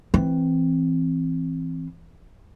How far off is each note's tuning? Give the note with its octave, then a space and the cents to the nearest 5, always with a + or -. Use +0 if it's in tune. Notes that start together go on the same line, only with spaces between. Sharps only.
E3 +0 C4 +0